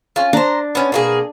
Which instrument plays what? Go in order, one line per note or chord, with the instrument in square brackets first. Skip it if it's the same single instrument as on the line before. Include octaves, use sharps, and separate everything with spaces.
[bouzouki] C#4 F4
[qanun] D4 [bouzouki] C5 A#5
[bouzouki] B3 C#4
B2 A#3 G#4